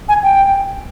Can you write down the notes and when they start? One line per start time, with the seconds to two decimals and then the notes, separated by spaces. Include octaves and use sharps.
0.09 G#5
0.23 G5